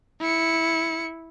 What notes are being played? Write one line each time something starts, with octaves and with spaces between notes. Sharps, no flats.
E4 C#7